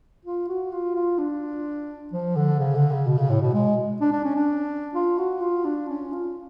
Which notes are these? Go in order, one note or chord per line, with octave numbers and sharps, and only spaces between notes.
F4
F#4
F4
F4
D4
F3
D3
C#3
D3
C#3
B2
C#3
A2
B2
G#3
D4
D4
C#4
D4
F4
F#4
F4
D4
C#4
F4